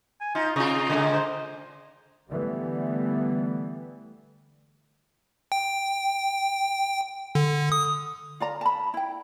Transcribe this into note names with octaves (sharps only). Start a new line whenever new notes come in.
G#5
D#4 F4
C3 D#4 F4
A#2 C#3 G#3
C5
D3 E3 G3 A3 B3
G5
D3
D#6
F4 D5 A#5
A5 B5
E4 G5